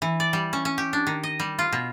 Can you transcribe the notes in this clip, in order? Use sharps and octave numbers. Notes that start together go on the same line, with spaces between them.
E3
D5
G3
C#4
C#4
G4
D4
D#3
D#5
G3
F4
B2